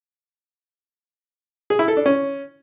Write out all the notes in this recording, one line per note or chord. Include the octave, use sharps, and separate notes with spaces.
G#4
E4
A4
D4
C#4